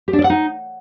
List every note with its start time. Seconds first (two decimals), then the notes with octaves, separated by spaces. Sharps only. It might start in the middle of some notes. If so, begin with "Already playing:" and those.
0.08 G4
0.13 D4
0.19 D5
0.24 F#5
0.30 D#4